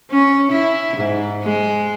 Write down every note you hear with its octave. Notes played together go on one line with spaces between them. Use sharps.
C#4
E4
G#2
G#3